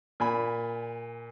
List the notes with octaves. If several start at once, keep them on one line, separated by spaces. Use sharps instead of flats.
A#2 G#5 B5